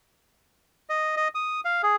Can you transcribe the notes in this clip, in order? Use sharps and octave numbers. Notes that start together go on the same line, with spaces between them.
D#5
D#5
D#6
F5
G#4